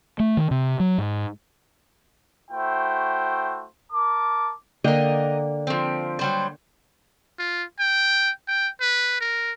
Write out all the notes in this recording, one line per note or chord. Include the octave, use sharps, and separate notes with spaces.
A3
D#3
C3
F#3
G#2
A3 E4 F#4 C5 G5
A#4 A5 D6
D3 A#3 A#4 D#5 G5
F3 C4
F#3 G3 C5
F4
G5
G5
B4
A#4